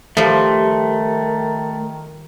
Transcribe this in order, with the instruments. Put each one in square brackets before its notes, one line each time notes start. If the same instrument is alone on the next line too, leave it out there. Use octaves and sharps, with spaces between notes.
[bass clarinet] D#3 [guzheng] F3 G3 [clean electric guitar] A3